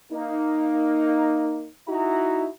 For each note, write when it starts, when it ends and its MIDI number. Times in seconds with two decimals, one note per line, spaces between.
0.12 1.67 58
0.12 1.67 63
1.88 2.46 63
1.88 2.46 64
1.88 2.46 66
1.88 2.46 82